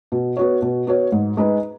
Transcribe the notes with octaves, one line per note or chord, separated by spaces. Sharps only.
B2
B3 F#4 C#5
B2
B3 F#4 C#5
G#2
G#3 D#4 B4